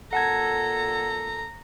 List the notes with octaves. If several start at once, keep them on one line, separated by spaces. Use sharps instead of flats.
A#2 A4 F#5 A5 A#5 G#6